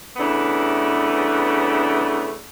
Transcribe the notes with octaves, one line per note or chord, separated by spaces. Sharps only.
C#3 E3 A3 B3 D4